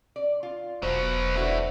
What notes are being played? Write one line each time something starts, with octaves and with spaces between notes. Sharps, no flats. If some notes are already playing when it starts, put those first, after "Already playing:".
D5
F4
E1 B2 F#3 C5
D3 A3 E4 F#4 B4